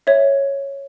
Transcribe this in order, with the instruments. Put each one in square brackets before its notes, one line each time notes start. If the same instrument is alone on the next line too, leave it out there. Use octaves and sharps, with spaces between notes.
[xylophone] C#5 E5